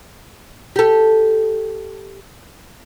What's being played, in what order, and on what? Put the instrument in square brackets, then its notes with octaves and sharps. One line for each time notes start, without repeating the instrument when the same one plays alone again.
[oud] G4 A4